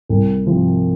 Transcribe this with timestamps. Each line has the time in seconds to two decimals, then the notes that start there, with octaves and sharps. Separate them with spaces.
0.09 C2
0.46 C3 F3